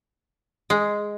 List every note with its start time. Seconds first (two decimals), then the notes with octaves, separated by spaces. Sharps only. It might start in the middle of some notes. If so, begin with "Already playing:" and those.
0.70 G#3